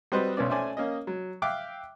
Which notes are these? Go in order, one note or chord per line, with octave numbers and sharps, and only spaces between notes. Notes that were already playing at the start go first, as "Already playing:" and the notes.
G3 C4 F#4 B4 C5 D#5
B1 B3 C#4 D5
A3 C#4 C5 D5 G#5
A#3 C#4 D#5
F#3
E5 F5 G5 D6 F#6